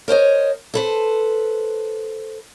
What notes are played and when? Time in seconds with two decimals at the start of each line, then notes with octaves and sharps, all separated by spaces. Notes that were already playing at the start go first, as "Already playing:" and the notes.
0.08 A#4 C5 C#5 D#5
0.74 A4 B4 C5